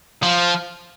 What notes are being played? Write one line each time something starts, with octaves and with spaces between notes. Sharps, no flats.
F3